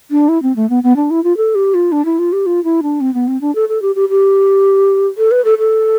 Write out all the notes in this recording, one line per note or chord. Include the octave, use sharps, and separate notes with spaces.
D4
E4
C4
A3
B3
B3
D4
E4
F4
A4
G4
F4
D4
E4
F4
G4
F4
E4
D4
C4
B3
C4
D4
A4
A4
G4
G4
G4
A4
B4
A4
A4